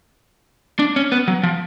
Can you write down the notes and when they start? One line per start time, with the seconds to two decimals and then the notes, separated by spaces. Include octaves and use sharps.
0.79 D4
0.96 C#4
1.12 B3
1.28 F#3
1.43 F3